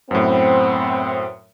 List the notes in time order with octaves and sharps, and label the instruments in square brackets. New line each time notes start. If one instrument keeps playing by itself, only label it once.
[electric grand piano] F#2 A2 [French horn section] B3 C4